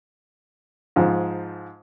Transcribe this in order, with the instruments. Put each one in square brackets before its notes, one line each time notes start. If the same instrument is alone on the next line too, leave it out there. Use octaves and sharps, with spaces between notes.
[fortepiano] G#2 F3